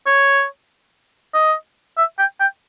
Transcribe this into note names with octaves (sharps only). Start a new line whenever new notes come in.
C#5
D#5
E5
G5
G5